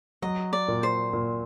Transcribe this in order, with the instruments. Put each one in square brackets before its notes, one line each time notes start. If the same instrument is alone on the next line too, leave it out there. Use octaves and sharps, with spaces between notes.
[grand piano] F#3 [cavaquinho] D#5
[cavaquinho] D5
[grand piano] A#2
[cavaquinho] C5
[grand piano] A#2